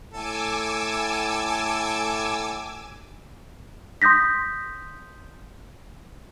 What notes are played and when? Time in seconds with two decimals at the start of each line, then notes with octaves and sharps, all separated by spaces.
0.14 A2 A4 G#5 D6 E6
4.02 C6 D#6 G6 A#6 B6